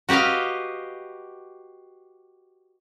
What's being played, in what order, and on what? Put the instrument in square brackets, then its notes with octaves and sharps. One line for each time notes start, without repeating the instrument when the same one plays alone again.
[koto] F#4 G4 B4 D#5 F5